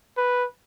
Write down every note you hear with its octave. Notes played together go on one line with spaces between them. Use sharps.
B4